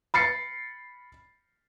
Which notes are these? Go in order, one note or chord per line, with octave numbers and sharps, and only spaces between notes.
B5 A6 C7 C#7